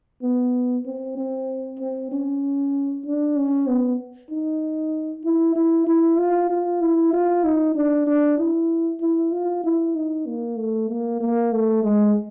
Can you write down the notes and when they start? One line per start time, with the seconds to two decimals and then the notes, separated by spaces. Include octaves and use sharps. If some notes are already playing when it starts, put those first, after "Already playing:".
0.22 B3
0.86 C4
1.18 C4
1.79 C4
2.12 C#4
3.06 D4
3.36 C#4
3.67 B3
4.30 D#4
5.25 E4
5.56 E4
5.87 E4
6.18 F4
6.50 F4
6.81 E4
7.13 F4
7.44 D#4
7.75 D4
8.07 D4
8.38 E4
9.01 E4
9.32 F4
9.64 E4
9.95 D#4
10.27 A#3
10.57 A3
10.89 A#3
11.21 A#3
11.52 A3
11.83 G#3